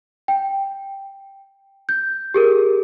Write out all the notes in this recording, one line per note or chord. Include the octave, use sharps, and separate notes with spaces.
G5
G6
G4 G#4 A#4